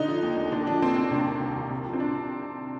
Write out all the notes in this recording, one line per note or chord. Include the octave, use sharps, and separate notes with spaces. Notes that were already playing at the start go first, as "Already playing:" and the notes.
Already playing: D3 D#4
F3
D#2
D#2
D3 D4
F3 D4
D#2 C4
D#2 C4
C3 D4
D#3
C2
C2
C3
F3
C4
D4